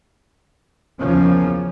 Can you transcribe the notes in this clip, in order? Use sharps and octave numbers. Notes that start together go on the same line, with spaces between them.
E2 C#3 F3 A#3 C#4